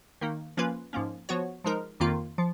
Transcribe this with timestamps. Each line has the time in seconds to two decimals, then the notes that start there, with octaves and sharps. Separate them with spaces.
0.21 D#3 A#3 D#4
0.57 F3 A#3 C#4 F4 B4
0.93 G#2 F3 A#3 C#4
1.29 F3 B3 F#4 C#5
1.64 F3 G#3 D#4 A#4
2.00 F2 D#3 A#3 F4
2.38 F3